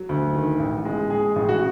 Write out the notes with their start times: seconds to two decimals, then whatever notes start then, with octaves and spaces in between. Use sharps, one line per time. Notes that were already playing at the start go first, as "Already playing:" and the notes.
Already playing: F#3
0.09 D2
0.34 D#3
0.59 A1
0.85 G#3
1.10 G#3 G#4
1.36 A1
1.49 F#4